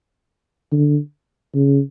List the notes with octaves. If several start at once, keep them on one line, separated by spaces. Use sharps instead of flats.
D3
C#3